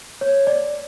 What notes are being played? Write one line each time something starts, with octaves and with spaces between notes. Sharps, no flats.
C#5
D5